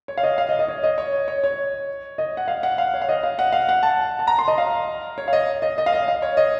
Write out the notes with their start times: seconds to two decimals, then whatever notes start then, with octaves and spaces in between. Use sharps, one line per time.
0.08 C#5
0.18 F5
0.23 D#5
0.38 F5
0.49 D#5
0.59 D#5
0.68 C#5
0.83 D#5
0.98 C#5
1.28 C#5
1.44 C#5
2.18 D#5
2.37 F#5
2.48 F5
2.63 F#5
2.78 F5
2.94 C#5
3.02 F5
3.09 D#5
3.23 F5
3.39 F#5
3.52 F5
3.69 F#5
3.83 A5
4.19 A5
4.27 A#5
4.39 C6
4.48 D#5
4.58 F5
5.18 C#5
5.28 F5
5.33 D#5
5.62 D#5
5.78 D#5
5.86 F5
5.92 D#5
6.08 F5
6.22 C#5
6.37 D#5